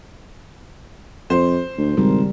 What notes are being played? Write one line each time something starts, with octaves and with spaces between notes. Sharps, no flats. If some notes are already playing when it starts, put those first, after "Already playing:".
F2 C5
D2
G#1 C#3 G3 A#4